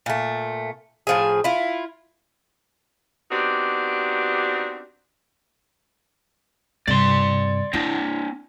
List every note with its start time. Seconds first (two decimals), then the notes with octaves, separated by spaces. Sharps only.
0.06 A#2 A3
1.07 A2 F3 G#4
1.44 E4 F4
3.30 B3 C4 D4 D#4 F#4 G4
6.87 G2 C3 D5 C6
7.73 C4 D4 E4